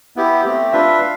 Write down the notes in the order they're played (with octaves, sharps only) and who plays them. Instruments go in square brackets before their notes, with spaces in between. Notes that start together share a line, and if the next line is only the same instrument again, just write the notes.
[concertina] B3 E4 G4
A3 C4 G4
D4 F4 B4 E5
F5